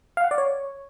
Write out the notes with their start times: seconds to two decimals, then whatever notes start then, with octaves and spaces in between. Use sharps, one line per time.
0.17 F5
0.24 F#5
0.31 D5
0.38 C#5